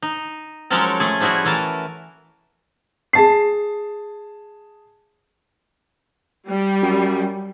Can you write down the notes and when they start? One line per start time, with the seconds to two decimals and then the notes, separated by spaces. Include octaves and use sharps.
0.02 D#4
0.70 F3 F#3 G#3 C#4 A4 A#4
1.00 A3 G#4
1.20 F3 G3 E4 F#4 G#4
1.45 E3 A3 A#4 A5
3.13 G#4 A5 C7
6.47 G3
6.82 F#2